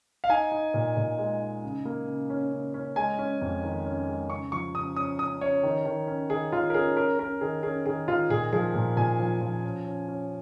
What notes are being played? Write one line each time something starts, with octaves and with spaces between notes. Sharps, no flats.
F5
D#4 G#5
D#4
A#2
A#2
G#3
D#4
C#3
A#3
C#3
C#4
C#3
C#4
G#3 G#5
C#4
F2
D#3
C#4
G#3
C#3 C#6
F3 C#6
C#3 D#6
C#4 D#6
C#4 D#6
C#4 C#5
D#3
D#3
C#4
D#3 G#4
D#3 F4
A#4
C#4 G#4
C#4 A#4
C#4 A#4
D#3 G#4
C#4 G#4
D#3 G#4
D#3 F4
A#2 G#4
F3 G#4
A#2
A#2 G#5
F3
F3
C#4
C#4
C#4